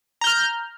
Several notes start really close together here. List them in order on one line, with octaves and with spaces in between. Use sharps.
A#5 G6 F6